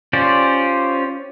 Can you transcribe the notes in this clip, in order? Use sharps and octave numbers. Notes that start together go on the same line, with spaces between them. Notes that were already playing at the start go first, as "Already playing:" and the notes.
C#4 F4 G4 C5 D5